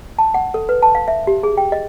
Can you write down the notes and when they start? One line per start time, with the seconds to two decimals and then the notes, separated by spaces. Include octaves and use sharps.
0.19 A5
0.34 F#5
0.54 A4
0.69 B4
0.83 A5
0.95 F5
1.08 E5
1.27 G4
1.43 G#4
1.57 G5
1.72 D#5